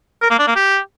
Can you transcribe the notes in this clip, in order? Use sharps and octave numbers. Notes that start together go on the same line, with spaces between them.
A#4
A#3
D4
A#3
G4